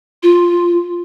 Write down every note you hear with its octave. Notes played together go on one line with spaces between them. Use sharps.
F4